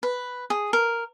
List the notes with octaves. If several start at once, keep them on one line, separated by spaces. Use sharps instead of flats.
B4
G#4
A#4